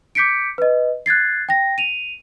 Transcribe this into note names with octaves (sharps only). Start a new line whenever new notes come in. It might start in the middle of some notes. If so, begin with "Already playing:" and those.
D6 G6 B6 C#7 D7
B4 D#5
F#6 G#6 A6 C7
G5 A#6
D#7 F7